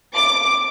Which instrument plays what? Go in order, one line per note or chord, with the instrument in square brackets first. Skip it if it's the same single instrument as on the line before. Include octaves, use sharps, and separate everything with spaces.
[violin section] D6